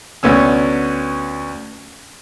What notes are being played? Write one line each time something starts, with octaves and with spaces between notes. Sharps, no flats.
D2 B3 C#4 E6